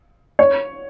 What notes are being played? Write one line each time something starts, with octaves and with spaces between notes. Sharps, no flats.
C#5